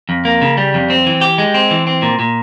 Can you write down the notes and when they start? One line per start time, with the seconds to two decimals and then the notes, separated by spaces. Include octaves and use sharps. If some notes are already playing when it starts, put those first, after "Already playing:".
0.09 F2
0.25 A#3
0.41 C#3
0.57 G3
0.74 F2
0.90 C4
1.06 E3
1.21 G4
1.38 G#3
1.54 C4
1.71 E3
1.87 C4
2.02 A#2
2.19 A#2